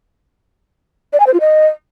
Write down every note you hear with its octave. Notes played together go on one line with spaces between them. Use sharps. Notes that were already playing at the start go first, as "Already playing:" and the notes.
D5
G#5
C5
F4
D#5